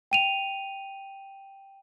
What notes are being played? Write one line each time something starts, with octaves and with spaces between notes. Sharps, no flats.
G5 D#7 F7